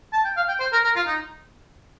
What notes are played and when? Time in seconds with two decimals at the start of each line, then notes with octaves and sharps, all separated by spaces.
0.13 A5
0.24 G5
0.37 F5
0.48 G5
0.60 C5
0.72 A#4
0.84 A#4
0.96 F4
1.07 D#4